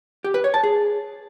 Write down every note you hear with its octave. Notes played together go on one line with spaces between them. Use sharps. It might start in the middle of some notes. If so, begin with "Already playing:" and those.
G4
B4
C#5
A5
G#4